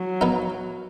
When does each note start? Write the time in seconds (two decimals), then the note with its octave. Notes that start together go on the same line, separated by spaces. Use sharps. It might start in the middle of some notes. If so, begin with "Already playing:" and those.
Already playing: F#3
0.21 B3 D#4